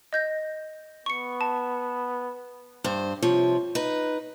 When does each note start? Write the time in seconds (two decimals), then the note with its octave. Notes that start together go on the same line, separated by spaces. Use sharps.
0.13 D#5 G6 A#6
1.06 B3 C#6 C#7
1.41 A5
2.84 G2 C5
3.22 C3 F3 C#5
3.75 D#4 B4